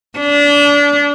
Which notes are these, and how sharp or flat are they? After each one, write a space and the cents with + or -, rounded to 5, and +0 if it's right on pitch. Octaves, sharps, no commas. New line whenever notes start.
D4 -25